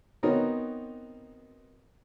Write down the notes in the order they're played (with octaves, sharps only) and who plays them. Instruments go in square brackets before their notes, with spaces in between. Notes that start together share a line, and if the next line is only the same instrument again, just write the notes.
[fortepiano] B3 C4 D#4 F#4 A#4 C#5